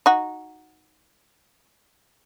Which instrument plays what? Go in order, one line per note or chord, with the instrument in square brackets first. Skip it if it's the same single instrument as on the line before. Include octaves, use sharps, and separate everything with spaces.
[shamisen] D#4 F#4